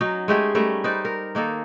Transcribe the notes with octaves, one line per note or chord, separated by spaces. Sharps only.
F#3 C#4 D#4
G#3 A3 G4 G#4
G3 A3 C#4 A#4
D#4 B4 C5 D5
A#4
D#3 A#3 D#4 A4